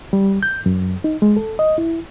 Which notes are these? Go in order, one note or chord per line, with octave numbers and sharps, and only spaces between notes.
G3
G6
F#2
D#4
G#3
A4
D#5
E4